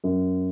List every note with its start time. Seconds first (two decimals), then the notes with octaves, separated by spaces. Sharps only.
0.04 F#2